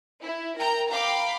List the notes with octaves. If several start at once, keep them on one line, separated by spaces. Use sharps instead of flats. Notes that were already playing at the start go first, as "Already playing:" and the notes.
E4
A#4 G5 A#5
F5 G5 A#5 B5 D6